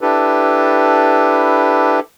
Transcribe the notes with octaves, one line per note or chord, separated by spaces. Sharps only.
D4 E4 G4 A4 B4